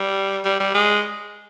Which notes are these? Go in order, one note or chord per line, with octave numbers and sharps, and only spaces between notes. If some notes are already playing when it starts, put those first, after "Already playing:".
Already playing: G3
G3
G3
G#3